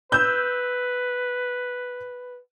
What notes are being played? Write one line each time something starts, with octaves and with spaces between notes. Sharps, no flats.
B4 E6 G6